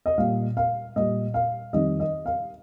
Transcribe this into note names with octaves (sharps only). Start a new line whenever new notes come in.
D#5
A#2 G3 F5
F5
A#2 G3 D#5
F5
F2 D#3 G3 D#5
D#5
F5